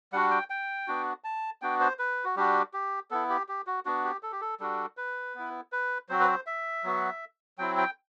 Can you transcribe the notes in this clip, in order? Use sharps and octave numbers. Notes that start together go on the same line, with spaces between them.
G3 D4 F#4 F#5
G5
G5
B3 D4 F#4
A5
B3 D4 F#4 G5
C5
B4
F#4
G3 D4 F#4 G4
G4
B3 E4 A4
G4
G4
F#4
B3 D4 F#4
G4
A4
G4
A4
G3 D4 F#4 A4
B4
B3 E4
B4
F#3 C4 F#4 C5
B4
C5
E5
F#3 B3 F#4
F#3 C4 E4 G5
G5